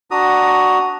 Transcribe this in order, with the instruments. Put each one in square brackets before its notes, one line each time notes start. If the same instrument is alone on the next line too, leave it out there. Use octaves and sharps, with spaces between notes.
[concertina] D4 F#4 A#5 D#6